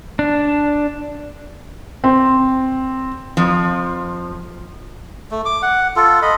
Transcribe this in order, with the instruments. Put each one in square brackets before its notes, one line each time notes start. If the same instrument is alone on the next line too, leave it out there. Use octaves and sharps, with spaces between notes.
[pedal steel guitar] D4
[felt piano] C4
[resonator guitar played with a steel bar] F2 F3
[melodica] A3
D6
F#5
F4 A4
D#5 B5